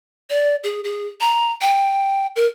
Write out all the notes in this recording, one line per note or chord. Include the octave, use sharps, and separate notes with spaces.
D5
G#4
G#4
A#5
G5
A#4